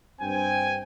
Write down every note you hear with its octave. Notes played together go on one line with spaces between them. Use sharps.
G2 C4 G5 G#5